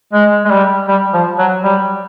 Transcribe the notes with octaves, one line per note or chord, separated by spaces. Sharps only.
G#3
G#3
G3
G3
F3
F#3
G3